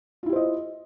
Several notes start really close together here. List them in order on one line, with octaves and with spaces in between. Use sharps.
F4 E4 G4 C5 D#5